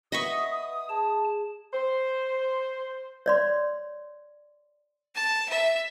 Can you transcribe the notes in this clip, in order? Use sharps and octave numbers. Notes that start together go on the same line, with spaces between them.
B4 D#5 E5 F#5 B5 C#6 D#6
G#4 A5
C5
C#5 D5 C6
A5
E5